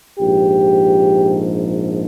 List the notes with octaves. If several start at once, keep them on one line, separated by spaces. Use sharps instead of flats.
A#1 G#2 F3 G4